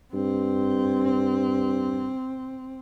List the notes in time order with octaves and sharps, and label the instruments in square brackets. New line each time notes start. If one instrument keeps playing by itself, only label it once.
[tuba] G2 [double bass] C4